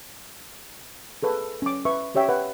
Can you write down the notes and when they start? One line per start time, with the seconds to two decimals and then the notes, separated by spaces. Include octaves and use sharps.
1.23 G#4 A4 B4
1.62 C#4 D6
1.85 B4 E5 C#6
2.14 C#4 G4 C#5 E5 G5
2.29 B4 F#5